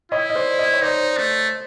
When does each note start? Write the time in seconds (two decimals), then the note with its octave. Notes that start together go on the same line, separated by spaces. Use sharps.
0.11 E4 C#5 D#5
0.30 D#5
0.35 C5 D5
0.59 C#5 D#5
0.73 C#5
0.82 D#4 C5 D5
1.17 A3